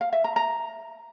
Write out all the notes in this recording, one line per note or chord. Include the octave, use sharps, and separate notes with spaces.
F5
E5
A#5
A#5